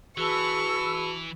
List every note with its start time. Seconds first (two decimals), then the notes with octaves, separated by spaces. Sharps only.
0.17 E3 F#4 G#4 B4 A5 B5 C#6 E6